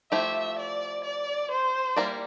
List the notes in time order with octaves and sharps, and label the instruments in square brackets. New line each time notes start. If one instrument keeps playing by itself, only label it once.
[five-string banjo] F3 A3 E4 G4 [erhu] E5
[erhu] D5
D5
C5
[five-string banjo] G3 A#3 E4 A#4 D5